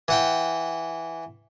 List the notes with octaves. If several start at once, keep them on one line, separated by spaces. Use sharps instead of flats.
E3 F#5 G5